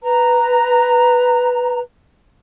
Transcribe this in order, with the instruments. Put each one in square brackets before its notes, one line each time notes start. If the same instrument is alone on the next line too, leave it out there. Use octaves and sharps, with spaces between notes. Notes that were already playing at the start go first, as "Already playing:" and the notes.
[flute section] B4 A#5